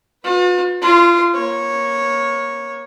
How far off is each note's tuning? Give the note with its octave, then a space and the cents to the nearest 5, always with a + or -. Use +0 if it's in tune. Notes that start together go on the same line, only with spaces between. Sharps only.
F4 +45 B4 +0
F4 -25 C6 +0
A#3 +20 C#5 -10